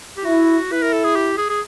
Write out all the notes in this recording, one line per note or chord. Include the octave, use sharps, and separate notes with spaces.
G4
E4 F#4
E4 B4
A#4
A4
G#4
G4
G#4
G#4